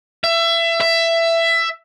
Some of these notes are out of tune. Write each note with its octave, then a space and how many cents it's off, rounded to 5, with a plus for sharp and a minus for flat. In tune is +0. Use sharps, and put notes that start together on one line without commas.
E5 +25
E5 +15